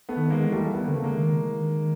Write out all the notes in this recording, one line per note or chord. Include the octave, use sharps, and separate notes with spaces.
A3 B3
D#3
D#3 G#3 A#3
E3
G3 A3
B3
D3 A#3
C#3 A3
G#3 A#3
D#3
E3
D#3